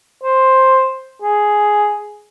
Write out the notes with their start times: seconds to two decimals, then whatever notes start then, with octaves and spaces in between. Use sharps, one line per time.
0.24 C5
1.22 G#4